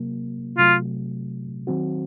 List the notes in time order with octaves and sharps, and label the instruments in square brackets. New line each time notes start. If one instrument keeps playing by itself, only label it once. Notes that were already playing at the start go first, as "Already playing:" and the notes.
Already playing: [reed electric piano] C3 F#3 A#3
[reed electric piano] C3 F#3 A3 [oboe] F4
[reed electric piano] D#3 F#3 C4 F#4